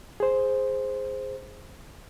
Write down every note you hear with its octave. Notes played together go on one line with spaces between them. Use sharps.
G#4 C5